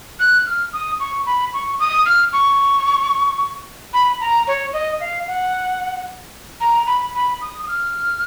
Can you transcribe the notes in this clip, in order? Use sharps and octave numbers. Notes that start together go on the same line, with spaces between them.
F#6
F6
D#6
C#6
B5
C#6
D#6
F6
C#6
B5
A#5
C#5
D#5
F5
F#5
A#5
B5
B5
D#6
D#6
F6